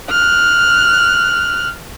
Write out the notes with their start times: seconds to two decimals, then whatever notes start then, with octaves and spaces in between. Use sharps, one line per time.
0.10 F6 F#6